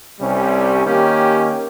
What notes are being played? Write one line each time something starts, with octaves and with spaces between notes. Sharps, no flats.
C2 C3 G3 C#4
D#3 A#3 C#4 G4